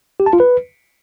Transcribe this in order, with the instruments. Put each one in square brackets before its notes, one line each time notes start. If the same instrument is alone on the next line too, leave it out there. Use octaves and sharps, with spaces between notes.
[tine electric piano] G4
A5
F4
B4